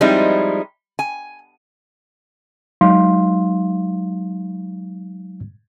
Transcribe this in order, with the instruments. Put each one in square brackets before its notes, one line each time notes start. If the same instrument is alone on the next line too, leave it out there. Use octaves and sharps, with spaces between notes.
[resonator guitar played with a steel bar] F3 G3 G#3 C4 D#4 E4
G#5
[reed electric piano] F#3 G#3 D#4 F5 C6